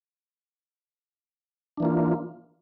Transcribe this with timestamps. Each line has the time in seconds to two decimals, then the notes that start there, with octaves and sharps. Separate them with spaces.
1.77 D4
1.80 E3
1.83 A#3
1.85 F4